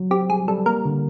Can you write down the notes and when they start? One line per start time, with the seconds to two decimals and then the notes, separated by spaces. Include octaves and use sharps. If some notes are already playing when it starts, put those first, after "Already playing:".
Already playing: F#3
0.11 C4 G4
0.29 G3 G#4
0.48 G3 A4
0.66 A#3 A#4
0.85 D3